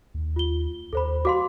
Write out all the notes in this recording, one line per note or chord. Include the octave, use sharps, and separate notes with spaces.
D#2
F4 G7
D#2 A4 C5 B5
F#4 F5 C6 D6